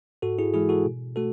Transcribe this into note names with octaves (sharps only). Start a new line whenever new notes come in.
G#2 F#4 A4
E4 G#4
E3 G#3 E4 G#4
F#4 A4
B2
A3 F#4 A4